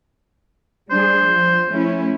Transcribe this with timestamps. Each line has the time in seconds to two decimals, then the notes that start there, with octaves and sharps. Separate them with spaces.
0.90 G3 D4 G#4 C5
1.24 F3
1.69 A3 C#4 E4